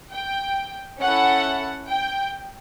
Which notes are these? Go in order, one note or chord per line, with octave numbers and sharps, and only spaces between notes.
G5
C#4 E4 A4 F#5
G5